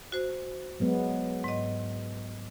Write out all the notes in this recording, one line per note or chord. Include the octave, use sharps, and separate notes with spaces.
F#4 C5
F#3 G#3 B3
G#2 D#5